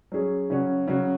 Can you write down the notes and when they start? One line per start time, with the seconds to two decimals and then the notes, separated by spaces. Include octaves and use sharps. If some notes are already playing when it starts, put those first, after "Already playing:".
0.12 F#3 C#4 G#4
0.50 C#3 F#3 C#4 F#4
0.88 C#3 F#3 C#4 F#4